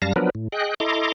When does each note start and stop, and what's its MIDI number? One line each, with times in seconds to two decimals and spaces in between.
0.02 0.13 42
0.02 0.13 55
0.02 0.13 77
0.02 0.13 81
0.02 0.13 94
0.16 0.30 53
0.16 0.30 54
0.16 0.30 59
0.16 0.30 62
0.16 0.30 70
0.16 0.30 71
0.35 0.48 45
0.52 0.74 68
0.52 0.74 75
0.52 0.74 79
0.52 0.74 90
0.80 1.12 64
0.80 1.12 69
0.80 1.12 75
0.80 1.12 82
0.80 1.12 84
0.80 1.12 86